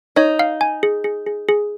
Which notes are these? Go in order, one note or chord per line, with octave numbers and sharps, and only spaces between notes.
D#4 C#5
F5
G#5
G#4
G#4
G#4
G#4